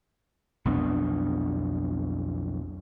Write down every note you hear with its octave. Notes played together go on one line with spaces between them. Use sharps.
B1 F2 B3 D4